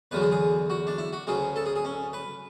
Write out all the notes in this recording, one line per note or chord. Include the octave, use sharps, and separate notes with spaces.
E2 D3 F#3 B4
G#4
G#4
F#4
D4
E4
F#4
D2 C#3 F#3 G#4
A4
G#4
G#4
C#4
B4